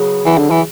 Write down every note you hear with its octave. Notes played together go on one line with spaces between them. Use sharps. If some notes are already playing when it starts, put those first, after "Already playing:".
Already playing: C#3 F#3 B3
E3
D3
E3